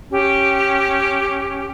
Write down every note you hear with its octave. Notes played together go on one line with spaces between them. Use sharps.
C#4 G4